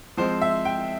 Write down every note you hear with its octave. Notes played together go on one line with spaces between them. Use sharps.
F3 G#3 C4 C5
E5
G5